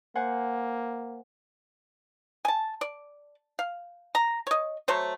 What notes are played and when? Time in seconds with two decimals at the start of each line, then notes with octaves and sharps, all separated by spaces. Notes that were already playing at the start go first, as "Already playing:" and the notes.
0.15 A#3 C5 F#5 G#5
2.45 G#5 A5
2.81 D5
3.59 F5
4.15 A#5
4.47 C#5 D#5
4.88 F#3 A3 C5 C#5